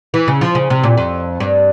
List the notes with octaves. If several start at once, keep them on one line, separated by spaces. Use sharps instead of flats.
E3
C#3
F3
C#3
C3
A#2
F2
G2